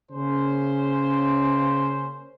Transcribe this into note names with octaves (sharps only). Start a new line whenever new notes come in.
C#3 A#3 C#4 C5